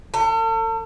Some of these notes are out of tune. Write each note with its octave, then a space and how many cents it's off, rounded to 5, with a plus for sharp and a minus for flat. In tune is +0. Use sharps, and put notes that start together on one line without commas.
A4 +40